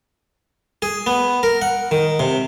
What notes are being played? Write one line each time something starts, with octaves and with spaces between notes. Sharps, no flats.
G#4
B3
A#4
F#5
D#3
C3